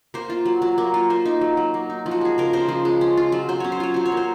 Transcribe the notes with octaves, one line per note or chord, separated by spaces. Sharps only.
A#3 C5
F4
F#3
F#3
A#3
F4
A#3 C5
D#4
F#3
F#3
A#3
D#4
F3
F#4
G#3 G#4
C#3 A#4
C#3 C5
F3
G#3
C#4
F4
F#3
F#3 C5
C#4 C#5
C5
F4 C#5
F#3 C5
C#5
A#3
C5